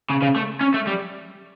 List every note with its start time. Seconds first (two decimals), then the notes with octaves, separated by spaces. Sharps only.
0.10 C#3
0.22 C#3
0.36 A3
0.61 C#4
0.74 A3
0.87 G3